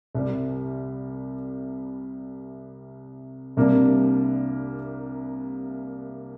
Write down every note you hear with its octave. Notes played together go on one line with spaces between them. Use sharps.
C2 C3 G3
C2 C3 G3 A#3 D4